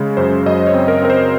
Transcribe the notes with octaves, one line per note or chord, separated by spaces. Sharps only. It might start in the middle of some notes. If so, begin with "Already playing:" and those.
Already playing: C#3 G#3
F#2 C5
F#2 D#5
C#5
C4
A#4
C4 A#4
C5